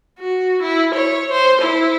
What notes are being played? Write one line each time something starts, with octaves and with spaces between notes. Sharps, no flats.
F#4
E4
C#5
C5
E4